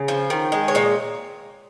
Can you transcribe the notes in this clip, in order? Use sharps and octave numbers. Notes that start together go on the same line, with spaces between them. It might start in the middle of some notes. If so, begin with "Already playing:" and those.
Already playing: C#3
F3
D#3
G#3
C#5
A#2 D#5